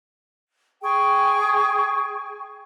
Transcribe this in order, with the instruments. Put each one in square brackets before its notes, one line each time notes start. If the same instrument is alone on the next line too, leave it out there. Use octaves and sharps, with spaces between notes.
[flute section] G#4 G5 C#6